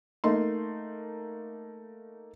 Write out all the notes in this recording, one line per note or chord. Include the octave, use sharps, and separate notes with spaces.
A3 A#3 D#4 C6